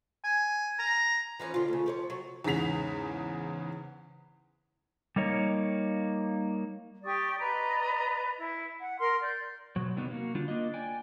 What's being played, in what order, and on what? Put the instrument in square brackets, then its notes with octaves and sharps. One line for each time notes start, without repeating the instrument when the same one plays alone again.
[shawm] G#5
A#5
[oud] E3 F3 C#4
D3 F4
D2 C#3
F3 A#4 C#5
C3 F#3
[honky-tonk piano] E2 G#2 C#3 B6 F7
[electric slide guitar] G3 A#3 D#4 C#5
[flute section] G4 D5 C#6 D#6
B4 D5 D#5 A#5
E4
F#5
A#4 C6 F6
D5 G6
[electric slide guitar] B2 F#3
C3 D#3 G3 B3
A#3 F#4
D3 G3 D4 F4
A#3 D4 F4 D#5
D5 G5 G#5